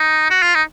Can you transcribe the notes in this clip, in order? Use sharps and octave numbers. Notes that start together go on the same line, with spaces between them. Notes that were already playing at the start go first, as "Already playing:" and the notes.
Already playing: D#4
F#4
F4
D#4